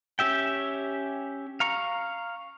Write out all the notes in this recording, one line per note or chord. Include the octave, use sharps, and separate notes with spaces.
C#4 G4 E5 G5
F5 A#5 C#6